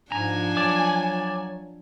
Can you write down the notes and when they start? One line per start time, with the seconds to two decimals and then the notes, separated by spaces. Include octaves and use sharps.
0.12 G#2 F3 D4 G#5 A#5
0.57 F#3 D5 A5 D6